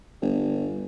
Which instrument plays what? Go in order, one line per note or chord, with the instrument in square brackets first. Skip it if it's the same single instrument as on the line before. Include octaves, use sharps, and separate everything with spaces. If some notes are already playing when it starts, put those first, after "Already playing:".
[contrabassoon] G1